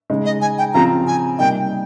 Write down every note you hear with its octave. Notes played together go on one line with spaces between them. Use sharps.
C#3 G#3 D#4
D#5
G#5
G5
C#3 F3 C4 F4 A#5
G#5
C3 G3 A#3 D#4 G5